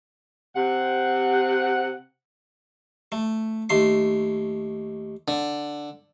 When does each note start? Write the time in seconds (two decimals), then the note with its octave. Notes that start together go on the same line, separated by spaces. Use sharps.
0.56 C3 F#5
3.12 A3
3.70 D#2 A3 C6
5.28 D3